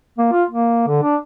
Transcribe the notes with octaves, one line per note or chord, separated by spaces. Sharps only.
A#3
F4
A#3
D3
D4